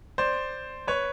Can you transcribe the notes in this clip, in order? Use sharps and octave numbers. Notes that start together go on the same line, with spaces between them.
C5 D5
B4 C#5